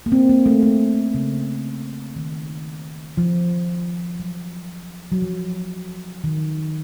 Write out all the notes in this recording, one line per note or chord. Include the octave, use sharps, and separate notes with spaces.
A#3
C4
A#3
A3
A3
C#3
D#3
F3
F#3
F#3
F3
D#3